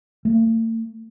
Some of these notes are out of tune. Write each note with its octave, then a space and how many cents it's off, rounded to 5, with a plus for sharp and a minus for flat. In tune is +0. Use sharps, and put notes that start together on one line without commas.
A3 +45